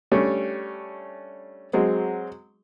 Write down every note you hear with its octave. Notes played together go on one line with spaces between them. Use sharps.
G3 A3 C#4 D4
F#3 G#3 C4